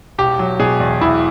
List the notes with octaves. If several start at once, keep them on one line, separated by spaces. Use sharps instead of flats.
E1 G4
F#3
B2 G#4
E2
E1 E4